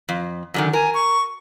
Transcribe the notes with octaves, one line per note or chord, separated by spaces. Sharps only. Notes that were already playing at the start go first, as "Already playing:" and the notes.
F2
F#2 D3 D#3
A#4 G#5
C#6